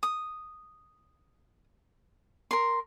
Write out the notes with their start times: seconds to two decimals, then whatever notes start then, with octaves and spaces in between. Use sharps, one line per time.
0.03 D#6
2.51 A#4 C6